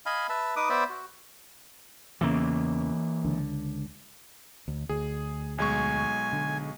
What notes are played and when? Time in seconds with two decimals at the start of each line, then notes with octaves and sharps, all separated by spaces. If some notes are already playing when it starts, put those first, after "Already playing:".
0.06 D#5 F5 G#5 B5
0.29 B4 E5 A5
0.56 D#4 B4 D6 D#6
0.70 B3 C5 D5 E5
0.90 F#4
2.21 E2 C#3 E3 A#3
3.24 C#2 D3
4.68 D2
4.89 D2 G#4
5.58 B1 G#3 G#5 C#6
6.33 D3